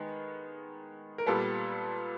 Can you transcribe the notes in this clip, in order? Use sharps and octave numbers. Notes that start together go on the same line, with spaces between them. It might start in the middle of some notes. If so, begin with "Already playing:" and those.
Already playing: D#3 G#3 B3
A#4
A#2 G3 B3 A4